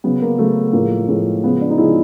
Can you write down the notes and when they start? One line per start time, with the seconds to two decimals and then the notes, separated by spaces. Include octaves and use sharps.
0.04 C#3 F#3 B3
0.22 A#3
0.38 C#3 F#3 A3
0.73 A2 F3 G#3 A#3
1.08 A2 F3 G#3
1.43 C#3 F3 G#3 B3
1.61 D4
1.70 D#4
1.78 C#3 F3 G#3 E4